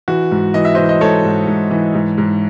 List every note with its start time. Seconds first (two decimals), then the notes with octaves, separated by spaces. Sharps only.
0.08 E3 F#4
0.31 G#2
0.54 E3 D#5
0.65 E5
0.75 E3 C5 D#5
0.89 D#5
1.01 G#2 A4 C#5
1.24 G#2
1.47 G#2
1.71 E3
1.94 G#2
2.18 G#2